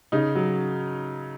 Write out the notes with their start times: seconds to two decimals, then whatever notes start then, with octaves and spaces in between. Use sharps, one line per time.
0.12 C#3 D#4
0.35 F#3